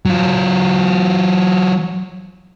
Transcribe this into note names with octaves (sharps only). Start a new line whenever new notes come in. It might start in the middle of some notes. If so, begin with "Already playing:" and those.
F#3 F4